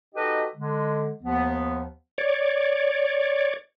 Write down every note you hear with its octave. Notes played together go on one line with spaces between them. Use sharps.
D#4 F#4 G4 A4 B4 D#5
D3 G#3
D#2 F3 B3
C#5 D5